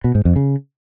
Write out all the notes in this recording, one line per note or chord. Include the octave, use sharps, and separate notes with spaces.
B2
G#2
F2
C#3